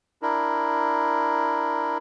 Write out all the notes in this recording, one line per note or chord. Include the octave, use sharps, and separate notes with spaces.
D4 E4 A#4